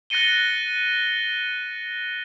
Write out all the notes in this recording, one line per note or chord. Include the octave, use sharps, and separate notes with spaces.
F#6 A6 A#6 C#7 D#7 G7